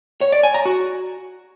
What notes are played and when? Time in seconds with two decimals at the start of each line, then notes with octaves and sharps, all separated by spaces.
0.21 C#5
0.32 D5
0.43 G#5
0.54 A#5
0.65 F#4